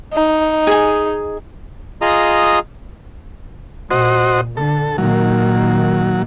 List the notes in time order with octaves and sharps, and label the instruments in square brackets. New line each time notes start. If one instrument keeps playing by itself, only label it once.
[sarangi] D#4
[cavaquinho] G#4 G#5
[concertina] F4 G#4 D#5 A#5 D#6
[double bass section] A#2 [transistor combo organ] F#4 C5 D#5
[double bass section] D3 [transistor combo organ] A4
[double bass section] A#2 D#3 A#3 [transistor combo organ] F#3